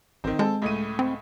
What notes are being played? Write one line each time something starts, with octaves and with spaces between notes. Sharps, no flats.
A1 D#3 C4
G#3 C4 A4
C#2 A2 D#7
C4